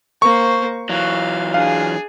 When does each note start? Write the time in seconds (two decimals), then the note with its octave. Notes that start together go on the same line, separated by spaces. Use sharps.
0.22 A#3 C5 C#6
0.89 E3 F#3 F5
1.54 D4 G#4 F5